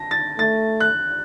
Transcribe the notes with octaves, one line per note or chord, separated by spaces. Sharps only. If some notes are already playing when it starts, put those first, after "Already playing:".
Already playing: A5 A#6
A6
A3 A6
F#6